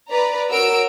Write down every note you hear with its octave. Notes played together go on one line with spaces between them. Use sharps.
B4 D5 A#5
F#4 A#4 C#5 E6 D7